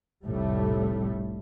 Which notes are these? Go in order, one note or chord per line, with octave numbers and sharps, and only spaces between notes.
F1 C2 A2 G3 A3